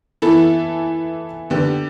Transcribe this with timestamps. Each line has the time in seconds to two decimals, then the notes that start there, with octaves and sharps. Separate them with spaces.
0.22 E3 B3 E4 A4
1.50 D3 B3 G4